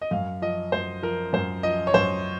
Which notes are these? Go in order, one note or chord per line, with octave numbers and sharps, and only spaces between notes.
D#5
F#2 F5
F3 D#5
F#2 C5
F3 A#4
F#2 C5
F3 D#5
C#5
F#2 C5